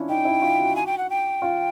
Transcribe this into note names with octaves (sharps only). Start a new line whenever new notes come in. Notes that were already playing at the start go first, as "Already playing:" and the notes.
Already playing: C#4 D4 E4 F4
D#4 G5
E4
F4
F#4
G#5
G5
F#5
G5
F4